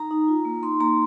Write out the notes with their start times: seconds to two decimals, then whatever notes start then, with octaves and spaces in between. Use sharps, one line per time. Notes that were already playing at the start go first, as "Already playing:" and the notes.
Already playing: D#4 A#5
0.11 D#4
0.28 F4
0.45 A#3
0.63 D#4 C6
0.80 A#3 A#5